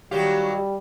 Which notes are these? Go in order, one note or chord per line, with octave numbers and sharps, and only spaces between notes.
D#3 F#3 G3 F#4 G4 F5